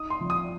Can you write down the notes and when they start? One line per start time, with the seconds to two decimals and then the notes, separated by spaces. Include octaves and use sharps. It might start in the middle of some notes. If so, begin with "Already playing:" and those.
Already playing: D#4 D#6
0.10 C6
0.21 F3
0.30 D#6